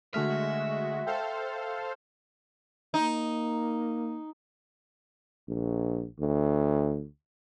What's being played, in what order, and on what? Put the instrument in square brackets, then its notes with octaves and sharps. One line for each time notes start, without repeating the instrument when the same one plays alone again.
[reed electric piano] D3 A3 F6 [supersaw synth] G#3 F#4 [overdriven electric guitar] E5
[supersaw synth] A4 C5 F5 [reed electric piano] G5
[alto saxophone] A#3 [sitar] D#4
[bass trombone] A#1
D2